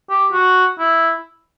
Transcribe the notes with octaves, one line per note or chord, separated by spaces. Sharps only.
G4
F#4
E4